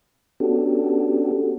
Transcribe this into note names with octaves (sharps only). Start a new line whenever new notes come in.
B3 C#4 D4 F#4 G4 A4